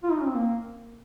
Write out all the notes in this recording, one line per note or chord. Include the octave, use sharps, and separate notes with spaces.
F4
D#4
C#4
C4
A#3